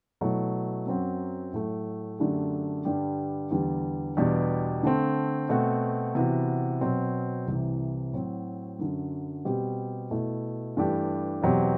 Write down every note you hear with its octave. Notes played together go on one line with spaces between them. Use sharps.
B2 F#3 A3 E4
F#2 F#3 C4 F#4
A2 F#3 A3
F#2 D3 A3 D4 G4
G2 D3 G3 D4 G4
E2 D3 G3
E2 B2 G3 D4 G4
D3 A3 C4
B2 A3 C4 F#4
C3 E3 B3 F#4
B2 F#3 C4
C2 C3 E3
A2 F#3 C4 F#4
F#2 D3 F#3
B2 G3 C4 G4
B2 A3 E4
G2 E3 A3 D4 G4
E2 B2 F#3 C4 G4